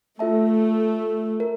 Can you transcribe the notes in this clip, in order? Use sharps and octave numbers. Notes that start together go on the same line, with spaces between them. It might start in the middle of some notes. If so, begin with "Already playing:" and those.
A3 F4 A4 E5 A5
A#4